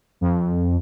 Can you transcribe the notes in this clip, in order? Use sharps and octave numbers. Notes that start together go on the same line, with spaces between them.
F2